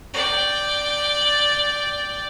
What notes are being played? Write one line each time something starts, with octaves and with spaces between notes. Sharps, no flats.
D5 G5